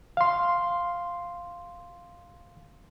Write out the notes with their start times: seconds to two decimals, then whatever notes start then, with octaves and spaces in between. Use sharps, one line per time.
0.17 F5 C6